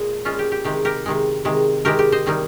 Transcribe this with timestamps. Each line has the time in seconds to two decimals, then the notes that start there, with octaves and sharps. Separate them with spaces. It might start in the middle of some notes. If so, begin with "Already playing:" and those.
Already playing: A#2 G#3
0.25 A#2 G#3 C#4 F4
0.39 G4
0.52 G4
0.65 C3 D#3 G#3 G4
0.85 G4 A#4
1.06 C3 D#3 G#3
1.45 C3 D#3 G#3
1.85 C3 D#3 G#3 G4 A#4
1.99 G4
2.12 C5 D#5
2.26 C3 D#3 G3 A#3 D#4